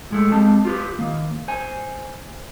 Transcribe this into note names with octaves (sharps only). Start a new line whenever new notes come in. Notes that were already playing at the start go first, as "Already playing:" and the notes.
A2 G#3 A3
G#3 C4 G4 A5
F4 G4 B4
D#3 A#3
C5 G#5